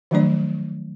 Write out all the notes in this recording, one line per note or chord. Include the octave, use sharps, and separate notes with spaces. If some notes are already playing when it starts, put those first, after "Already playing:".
D#3 F3 F#3 A3 D4 D5